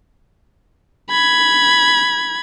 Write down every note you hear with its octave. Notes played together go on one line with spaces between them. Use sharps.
B5 G#6